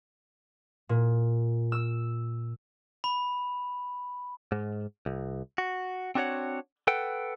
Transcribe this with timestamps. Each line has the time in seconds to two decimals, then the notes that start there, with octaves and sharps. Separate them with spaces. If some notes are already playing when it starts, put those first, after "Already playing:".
0.89 A#2
1.72 E6
3.04 B5
4.52 G#2
5.06 C2
5.58 F#4
6.15 C4 D4 F#4 A4 C#5 F#5
6.87 A4 B4 F#5 G5